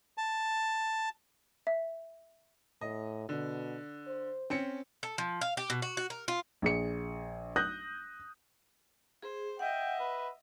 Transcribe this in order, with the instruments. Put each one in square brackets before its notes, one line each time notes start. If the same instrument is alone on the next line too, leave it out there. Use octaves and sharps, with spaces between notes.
[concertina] A5
[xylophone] E5
[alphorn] A2 [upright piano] D#5
[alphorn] B2 [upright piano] D3
[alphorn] C5
[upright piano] C4 C#4 C#7
[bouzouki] A4
F3
F5
G4
B2
F#4
F#4
A#4
F4
[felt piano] A#1 G#4 C#7
D#6 F#6 G6 A#6
[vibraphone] G#4 [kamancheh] C5
[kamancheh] D#5 E5 [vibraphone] F#5 [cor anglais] G5
[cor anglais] B4